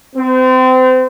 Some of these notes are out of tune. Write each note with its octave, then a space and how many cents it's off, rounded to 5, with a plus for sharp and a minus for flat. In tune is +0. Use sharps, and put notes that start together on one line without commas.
C4 -30